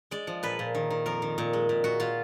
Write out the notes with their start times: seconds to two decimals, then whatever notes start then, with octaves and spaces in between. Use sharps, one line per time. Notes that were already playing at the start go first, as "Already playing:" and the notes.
0.11 G#3 D5
0.27 F3
0.43 A#2 B4
0.59 A#2
0.75 D#3
0.90 D#3
1.06 F2 A#4
1.22 D#3
1.38 A#2
1.53 G#3
1.69 A#2
1.84 A#2 F#4
2.00 A#2 F4